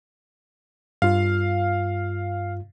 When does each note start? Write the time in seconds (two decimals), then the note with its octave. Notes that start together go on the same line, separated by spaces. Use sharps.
1.02 G2 F4 F5